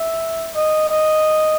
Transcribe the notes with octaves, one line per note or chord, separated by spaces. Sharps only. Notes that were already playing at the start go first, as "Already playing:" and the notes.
Already playing: E5
D#5
D#5